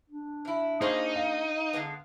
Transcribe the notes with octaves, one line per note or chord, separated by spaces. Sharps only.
D4
F#2 E4
A#3 D#4 F4 G#4 C5 C#6
F5
D3 G#3 B3